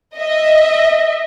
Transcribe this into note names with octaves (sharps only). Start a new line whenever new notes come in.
D#5 E5